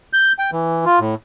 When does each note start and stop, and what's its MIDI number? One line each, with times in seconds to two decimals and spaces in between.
0.13 0.33 91
0.39 0.51 79
0.52 0.85 52
0.85 0.99 65
0.99 1.15 45